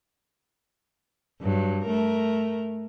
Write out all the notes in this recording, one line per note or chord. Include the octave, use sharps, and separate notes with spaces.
G2 F#3
A3 A#4